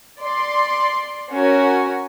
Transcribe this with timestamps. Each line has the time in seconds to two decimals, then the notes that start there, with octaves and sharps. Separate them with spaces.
0.21 D5 C6
1.31 C#4 F#4 A#4 G#5